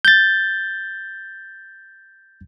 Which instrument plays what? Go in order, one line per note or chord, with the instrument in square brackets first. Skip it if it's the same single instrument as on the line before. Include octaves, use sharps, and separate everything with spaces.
[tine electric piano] G6 A6